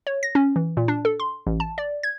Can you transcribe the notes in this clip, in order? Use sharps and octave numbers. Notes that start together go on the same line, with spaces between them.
C#5
A#6
C#4
E3
A#2
D4
A4
C6
A1
A5
D5
G#6